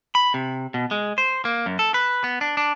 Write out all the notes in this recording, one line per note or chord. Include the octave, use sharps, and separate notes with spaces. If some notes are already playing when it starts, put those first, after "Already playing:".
B5
C3
B2
G#3
C5
A#3
F#2
A4
B4
B3
D4
D4